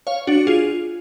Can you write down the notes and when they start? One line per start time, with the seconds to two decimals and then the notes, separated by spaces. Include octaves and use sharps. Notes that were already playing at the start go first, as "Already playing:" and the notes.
0.07 C#5 F5
0.27 D4 F#4
0.47 F4 G#4